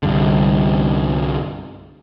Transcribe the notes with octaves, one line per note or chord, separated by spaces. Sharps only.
C2 G2 D3